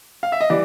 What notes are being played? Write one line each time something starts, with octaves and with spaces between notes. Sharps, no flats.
F5
E5
D#5
E3 G3 D5